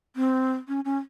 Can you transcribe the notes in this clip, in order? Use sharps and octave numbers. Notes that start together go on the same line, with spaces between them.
C4
C#4
C#4